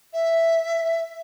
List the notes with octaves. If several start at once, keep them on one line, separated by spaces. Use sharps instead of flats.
E5